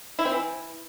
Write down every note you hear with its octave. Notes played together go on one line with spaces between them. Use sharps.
E4
C4
E3